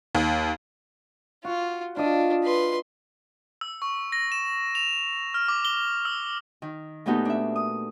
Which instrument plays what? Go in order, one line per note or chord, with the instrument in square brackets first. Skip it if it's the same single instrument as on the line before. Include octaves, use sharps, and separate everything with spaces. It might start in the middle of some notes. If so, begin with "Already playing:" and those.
[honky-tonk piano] D#2
[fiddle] F4 [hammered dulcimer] F#4
[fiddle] D4 [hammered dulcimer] F4 D#5
[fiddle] B4 C6
[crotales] E6
C#6
A#6
E7
F7
F6
D6
G7
E6
[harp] D#3
A#2 A3 B3 D#4 F#4 G4
D4 E5
D#6